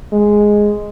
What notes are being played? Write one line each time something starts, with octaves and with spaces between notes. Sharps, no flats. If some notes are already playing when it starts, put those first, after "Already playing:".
G#3